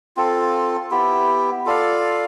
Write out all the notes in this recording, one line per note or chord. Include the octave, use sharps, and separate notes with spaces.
C4 F4 A4
B3 E4 G4
F4 A4 D5 F5